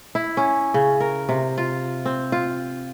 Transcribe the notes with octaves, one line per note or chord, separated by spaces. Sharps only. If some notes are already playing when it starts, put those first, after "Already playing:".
E4
C#4
C#3
A#4
C3
F4
C4
F4